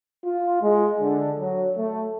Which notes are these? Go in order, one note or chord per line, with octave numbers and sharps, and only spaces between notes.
F4
G#3
D3
F#3
A3